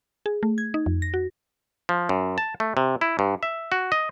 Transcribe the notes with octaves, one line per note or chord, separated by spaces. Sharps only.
G#4
A3
G#6
D#4
F2
A#6
F#4
F3
F#2
A5
A3
C3
E4
G2
E5
F#4
D#5